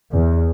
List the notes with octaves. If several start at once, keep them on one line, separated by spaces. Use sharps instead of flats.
E2